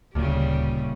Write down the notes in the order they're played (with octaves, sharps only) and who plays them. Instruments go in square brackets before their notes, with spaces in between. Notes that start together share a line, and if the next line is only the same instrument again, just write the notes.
[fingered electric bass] D#1 A#2 [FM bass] D2 [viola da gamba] C#3 G3